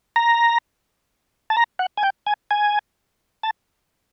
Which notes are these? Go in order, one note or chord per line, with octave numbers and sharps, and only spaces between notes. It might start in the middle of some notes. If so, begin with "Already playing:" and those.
A#5
A5
A#5
F#5
G#5
G5
G#5
G#5
A5